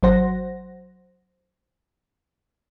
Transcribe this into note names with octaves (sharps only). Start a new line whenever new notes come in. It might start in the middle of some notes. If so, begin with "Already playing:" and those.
G#1 F#3 C5 F#5 A#6